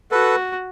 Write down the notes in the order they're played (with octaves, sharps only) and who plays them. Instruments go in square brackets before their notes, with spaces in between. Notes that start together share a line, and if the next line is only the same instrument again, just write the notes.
[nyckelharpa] F#4 [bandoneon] A4 B4